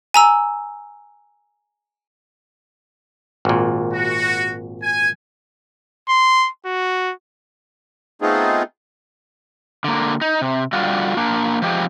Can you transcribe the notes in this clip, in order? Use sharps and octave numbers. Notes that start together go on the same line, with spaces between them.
G#5 A#5 E6
G#1 A#2
F#4
G#5
C6
F#4
A3 B3 C4 D#4 F4 G#4
D3 A#3
D#4
C3
D3 G3 F4 F#4
A#3 D4
F3 G#3 C4 G4